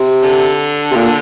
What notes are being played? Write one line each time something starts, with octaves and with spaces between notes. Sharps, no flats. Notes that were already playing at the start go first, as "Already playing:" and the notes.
Already playing: C3
D3
C3
A#2